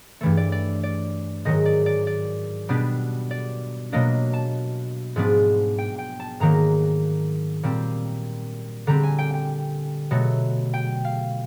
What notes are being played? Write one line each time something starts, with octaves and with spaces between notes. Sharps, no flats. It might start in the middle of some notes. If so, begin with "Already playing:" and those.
G2 E3 A3
D5
D5
D5
G#2 D#3 F#3 D#5
D5
D5
D5
B2 G3 B3 D4
D5
B2 F#3 A#3 D4 D#5
A5
G#2 F3 G#3 B3 D4
G5
G5
A5
G#2 D#3 F#3 A#3 A#5
A#2 G3 C4
D3 G3 C4 A#5
G#5
G5
G5
B2 F#3 A3
G5
F5